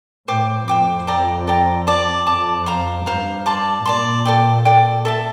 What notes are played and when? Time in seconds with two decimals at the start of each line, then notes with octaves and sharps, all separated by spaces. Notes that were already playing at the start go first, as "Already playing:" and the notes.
0.28 A2 C5 G5 D6
0.68 F2 C5 G5 D6
1.07 A4 D5 G5 A#5
1.47 A4 D5 G5 A#5
1.87 D5 A5 D6
2.27 F2 D5 A5 D6
2.66 C5 F5 A#5
3.06 G2 C5 F5 A#5
3.46 D5 A5 C6
3.85 A#2 D5 A5 C6
4.25 A4 D5 G5
4.65 A4 D5 G5
5.05 A4 E5 A5